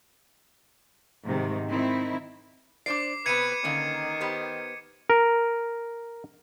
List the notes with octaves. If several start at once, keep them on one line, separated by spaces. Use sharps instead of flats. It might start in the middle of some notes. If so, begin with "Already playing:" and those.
G#2 C3 D#3 G#3
D#3 C4 D#4 E4
D4 C5 D5 D6 C7
C3 B3 B4 G#6 C#7 D#7
D3 D#3 A#3 C#4
B3 G4 C5
A#4